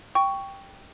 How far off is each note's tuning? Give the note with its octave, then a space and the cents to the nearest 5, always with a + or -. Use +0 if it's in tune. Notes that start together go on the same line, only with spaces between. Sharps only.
G5 +0 C#6 +10